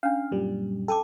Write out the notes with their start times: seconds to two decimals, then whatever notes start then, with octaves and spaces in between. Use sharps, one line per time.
0.03 C#4 D4 F5
0.31 F#2 A#2 G3
0.88 A4 G5 A5 D6